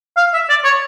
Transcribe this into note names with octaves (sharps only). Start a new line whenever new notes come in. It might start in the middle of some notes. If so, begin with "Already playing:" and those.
F5
E5
D5
C#5